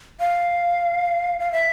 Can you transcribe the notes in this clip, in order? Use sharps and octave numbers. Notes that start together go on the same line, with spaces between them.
F5
F5
E5